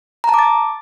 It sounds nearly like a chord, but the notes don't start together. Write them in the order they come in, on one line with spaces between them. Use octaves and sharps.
A#5 A5 D6 A6